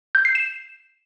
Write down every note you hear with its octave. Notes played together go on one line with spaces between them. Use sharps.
G6
C7
E7